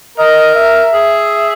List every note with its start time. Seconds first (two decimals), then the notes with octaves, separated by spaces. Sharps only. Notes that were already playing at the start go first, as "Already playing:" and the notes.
0.18 A#4 D#5
0.56 E5
0.93 G#4